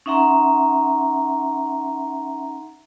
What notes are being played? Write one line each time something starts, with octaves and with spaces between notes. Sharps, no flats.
C#4 D#4 E5 F#5 A#5 C6